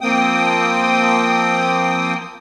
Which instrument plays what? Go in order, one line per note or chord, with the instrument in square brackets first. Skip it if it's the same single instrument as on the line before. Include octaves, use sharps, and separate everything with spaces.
[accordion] F3 A#3 C4 G5 D#6